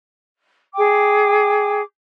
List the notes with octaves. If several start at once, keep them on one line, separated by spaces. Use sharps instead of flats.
G#4 G5 D6